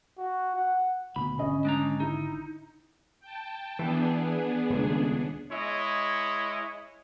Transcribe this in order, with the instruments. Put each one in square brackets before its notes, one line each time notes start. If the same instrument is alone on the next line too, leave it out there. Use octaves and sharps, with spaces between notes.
[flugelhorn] F#4
F#5
[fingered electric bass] D2 B2 [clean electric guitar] B5
[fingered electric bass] G#1 D3 [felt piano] C#4 D#5
[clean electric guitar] G#3 D4 A#5
[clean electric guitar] D#4 [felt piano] E4
[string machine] G5 A5
[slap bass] E3 [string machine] B3 D4 G#4
[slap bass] D#1 C#2
[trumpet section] G#3 E4 C#5 D#5